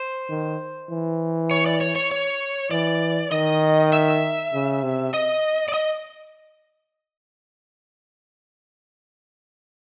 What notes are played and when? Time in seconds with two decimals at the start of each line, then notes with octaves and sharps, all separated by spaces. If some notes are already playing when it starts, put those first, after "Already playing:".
Already playing: C5
0.30 D#3
0.90 E3
1.51 C#5
1.66 D5
1.81 C#5
1.96 C#5
2.11 C#5
2.71 E3 D5
3.32 D#3 D#5
3.92 E5
4.53 C#3
4.83 C3
5.14 D#5
5.68 D5
5.74 D#5